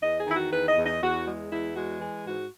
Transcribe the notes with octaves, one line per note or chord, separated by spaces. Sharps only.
E2 D#5
G#4
D#3 E4
F#4
E2 B4
D#5
E2
D#5
E2 F#4
G#3
E2 E4
G#3 F#4
E3 G#4
G#2 F#4